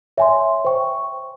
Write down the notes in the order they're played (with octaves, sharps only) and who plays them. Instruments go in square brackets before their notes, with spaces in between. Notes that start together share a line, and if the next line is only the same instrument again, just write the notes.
[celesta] C#5 E5 G#5 C6
C5 G5 C#6